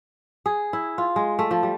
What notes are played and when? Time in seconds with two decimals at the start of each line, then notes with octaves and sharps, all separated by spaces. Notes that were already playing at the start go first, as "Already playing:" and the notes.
0.46 G#4
0.73 E4
0.98 F4
1.16 G#3
1.39 A3
1.51 F3
1.63 G3